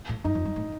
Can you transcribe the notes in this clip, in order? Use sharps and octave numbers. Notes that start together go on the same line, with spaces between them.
A2
G2 D#4
F2
G2
A2